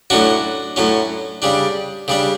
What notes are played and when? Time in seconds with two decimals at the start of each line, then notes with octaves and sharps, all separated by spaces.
0.10 A2 F#3 C#4 D4 F#4
0.76 A2 F#3 C#4
1.42 C#3 G3 D4
2.08 C#3 G3 D4